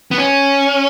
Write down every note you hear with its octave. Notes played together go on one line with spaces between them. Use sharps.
B3
C#4